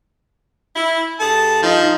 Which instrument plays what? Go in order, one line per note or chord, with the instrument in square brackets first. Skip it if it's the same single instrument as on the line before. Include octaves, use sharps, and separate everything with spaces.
[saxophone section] E4
[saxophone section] G2 G#4 A4 [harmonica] A5
[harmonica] F3 [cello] D#4